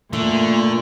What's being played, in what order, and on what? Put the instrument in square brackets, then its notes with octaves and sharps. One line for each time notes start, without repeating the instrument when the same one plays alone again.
[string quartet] A#2 [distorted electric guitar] D3 [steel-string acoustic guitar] A3